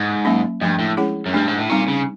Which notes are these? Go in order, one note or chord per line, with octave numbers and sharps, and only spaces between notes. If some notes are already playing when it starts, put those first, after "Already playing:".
Already playing: G#2
F#3 A#3 C#4
G2 F3 A3 D4
A2
G#3 C#4 E4 G#4 C#5
F#2
G2 A3 D4 G4
G#2
A2
A#2 G3 C4 D#4
C#3